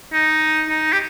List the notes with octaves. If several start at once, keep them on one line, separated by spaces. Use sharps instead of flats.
D#4
D#4
G4